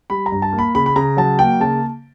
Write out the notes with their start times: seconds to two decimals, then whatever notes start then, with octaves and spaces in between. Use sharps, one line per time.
0.10 G3 B5
0.26 A#5
0.32 G2
0.42 A5
0.53 A#3
0.59 B5
0.75 C#3 B5
0.86 B5
0.96 C#3 A#5
1.17 F#3 A5
1.39 A#3 G5
1.60 C#3 A5